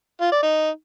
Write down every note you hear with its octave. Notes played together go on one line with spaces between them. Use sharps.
F4
D5
D#4